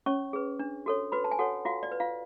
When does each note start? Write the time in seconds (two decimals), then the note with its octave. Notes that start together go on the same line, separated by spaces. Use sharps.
0.06 C#4 C#5 C#6
0.33 G#4 B4
0.59 D4
0.86 F#4 A4 C#5
1.12 F#4 B4 B5
1.24 A5
1.31 G#5
1.39 F#4 A4 C#5 F#5
1.65 F4 F#4 F5
1.83 D5
1.92 B4
2.00 F4 F5